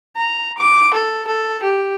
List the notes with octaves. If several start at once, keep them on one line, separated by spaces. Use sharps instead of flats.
A#5
D6
A4
A4
G4